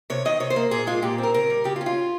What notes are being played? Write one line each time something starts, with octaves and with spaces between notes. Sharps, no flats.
C3 C#5
D#3 D#5
C3 C#5
C5
A#3
A#2 G#4
G#3 F4
A#2 G4
C4
A#4
C#3 A#4
G3
C#3 G4
F4
C#4
F4